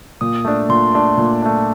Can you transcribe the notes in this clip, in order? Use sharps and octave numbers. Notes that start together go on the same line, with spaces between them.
A#2 D#6
A3 D4
A#2 C6
A3 D4
A#2
A3 D4